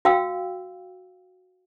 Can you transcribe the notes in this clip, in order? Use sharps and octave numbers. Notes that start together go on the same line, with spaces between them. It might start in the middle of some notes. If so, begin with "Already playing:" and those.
F#4 F5 G5 E6